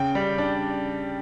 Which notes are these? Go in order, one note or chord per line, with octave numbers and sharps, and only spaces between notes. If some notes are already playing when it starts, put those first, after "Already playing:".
Already playing: C#3 G5
G3
D4